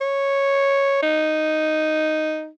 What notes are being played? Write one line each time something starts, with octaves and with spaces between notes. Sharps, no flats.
C#5
D#4